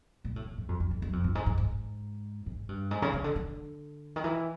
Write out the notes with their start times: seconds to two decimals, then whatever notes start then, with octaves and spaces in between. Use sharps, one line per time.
0.24 A#2
0.36 A2
0.46 A2
0.58 G#2
0.69 F2
0.80 F#2
0.91 F2
1.02 F#2
1.13 F2
1.24 G2
1.35 G#2
1.46 G#2
1.58 G#2
2.46 G#2
2.69 G2
2.91 G#2
3.02 C#3
3.14 C#3
3.24 D3
3.36 D3
4.16 D#3
4.24 E3